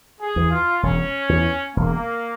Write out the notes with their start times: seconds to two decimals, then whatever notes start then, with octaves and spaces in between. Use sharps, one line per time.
0.21 G#4
0.36 E2 E3
0.51 F4
0.83 E1 C#4
1.29 E2 E3
1.76 E1 A#3